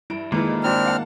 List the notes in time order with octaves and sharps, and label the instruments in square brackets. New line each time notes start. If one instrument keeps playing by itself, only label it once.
[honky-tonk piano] G2 D7 [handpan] E4
[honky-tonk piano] F2 E3 E4 [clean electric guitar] A#2 [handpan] D#3 G#3
[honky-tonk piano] G2 E4 F#4 [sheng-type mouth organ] C4 D4 F6
[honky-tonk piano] F5 F#5 A5